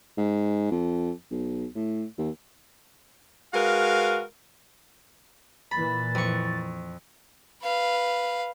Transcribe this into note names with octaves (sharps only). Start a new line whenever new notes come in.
G#2
F2
B1
A2
D#2
G#3 F#4 A#4 B4 F5
A#2 E3 B5 A6
F2 C#6
B4 F5